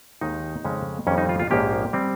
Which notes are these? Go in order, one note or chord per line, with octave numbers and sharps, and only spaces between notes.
D#2 D#3 G#3 D#4
F2 C#3 G#3 C#4
F2 D#3 G3 C#4
D#4
F4
F4
A#1 G#2 F3 A#3 C#4 G4
G3 C4